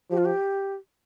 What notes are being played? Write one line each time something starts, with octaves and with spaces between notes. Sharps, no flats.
F3 G4
F4
G4